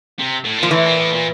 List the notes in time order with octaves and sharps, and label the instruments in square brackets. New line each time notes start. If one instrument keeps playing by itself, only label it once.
[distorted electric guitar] C3
A2
[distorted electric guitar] A#2 [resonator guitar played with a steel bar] F3
[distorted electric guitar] A2 [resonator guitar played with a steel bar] E3
[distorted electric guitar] A#2
A2
A#2